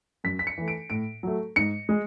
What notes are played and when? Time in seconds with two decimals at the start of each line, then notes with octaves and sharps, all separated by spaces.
0.24 F#2 B6
0.39 B6
0.47 C#7
0.58 E3 A3
0.68 D7
0.90 A2 D7
1.23 F#3 A3
1.56 G#2 C#7
1.89 G#3